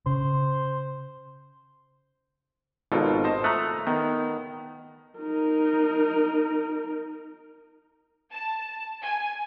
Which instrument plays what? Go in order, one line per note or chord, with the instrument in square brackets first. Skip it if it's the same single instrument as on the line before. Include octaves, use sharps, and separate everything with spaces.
[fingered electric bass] C#3 [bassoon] C5
[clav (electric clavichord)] G#1 B2 [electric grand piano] F4 A4 A#4
[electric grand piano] C5 D#5 A5
[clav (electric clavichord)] A3 [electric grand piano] A#5 D#6 F#6
[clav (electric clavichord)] D#3 [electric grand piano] B3
[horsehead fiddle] D#4 A#4
[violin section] A5
G#5